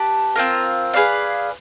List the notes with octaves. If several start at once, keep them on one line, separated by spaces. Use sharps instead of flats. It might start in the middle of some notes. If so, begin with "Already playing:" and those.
Already playing: G4 B4 A5
C4 F4 A#4
G#4 B4 D5 F5